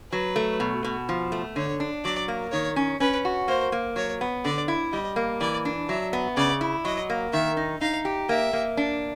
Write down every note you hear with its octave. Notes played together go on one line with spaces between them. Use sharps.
F#3 B4
A3
B2
B2
F3
A3
D3 C#5
D4
F#3 D5
A#3
D#3 C#5
C#4
C#4 B4
F#4
A#3 C5
A#3
F#3 C#5
B3
D3 D5
E4
G3 D#5
A#3
E3 D5
D4
F#3 E5
B3
C#3 D5
E4
F#3 D#5
A#3
D#3 E5
D#4
D#4 F5
G4
A#3 E5
A#3
D4